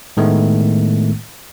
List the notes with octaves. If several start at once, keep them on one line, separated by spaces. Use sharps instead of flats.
A2 D#3 G#3 A3 B3